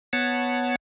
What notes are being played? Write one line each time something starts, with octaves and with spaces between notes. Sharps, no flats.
B3 C#5 F#5 A5